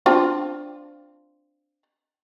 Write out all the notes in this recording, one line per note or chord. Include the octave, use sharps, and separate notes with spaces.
C4 D4 F4